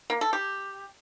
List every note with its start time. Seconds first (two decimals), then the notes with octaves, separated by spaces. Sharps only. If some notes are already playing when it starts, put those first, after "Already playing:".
0.10 A#3
0.21 A4
0.33 G4